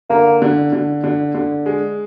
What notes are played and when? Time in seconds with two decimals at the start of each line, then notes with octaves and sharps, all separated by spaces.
0.10 D3 A#3
0.42 D3
0.73 D3
1.04 D3
1.35 D3
1.66 G#3